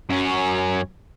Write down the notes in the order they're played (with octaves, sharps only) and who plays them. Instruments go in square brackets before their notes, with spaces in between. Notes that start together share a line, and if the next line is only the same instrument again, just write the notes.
[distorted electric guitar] F#2 C#4